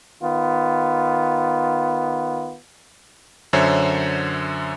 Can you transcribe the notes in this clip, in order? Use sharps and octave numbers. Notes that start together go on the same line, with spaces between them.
D#3 B3 F4
F#2 D3 C5 C#5 E5